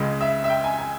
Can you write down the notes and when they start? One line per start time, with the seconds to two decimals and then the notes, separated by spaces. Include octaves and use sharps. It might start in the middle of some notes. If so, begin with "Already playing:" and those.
Already playing: C#2 C#3 G#3
0.21 E5
0.44 E5
0.50 G5
0.64 G#5
0.78 G#5